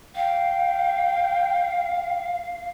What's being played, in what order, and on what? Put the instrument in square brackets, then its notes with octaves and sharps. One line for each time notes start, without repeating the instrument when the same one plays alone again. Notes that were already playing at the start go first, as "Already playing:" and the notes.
[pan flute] F5 [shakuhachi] G5